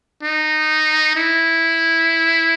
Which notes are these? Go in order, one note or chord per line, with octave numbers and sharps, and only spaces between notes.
D#4
E4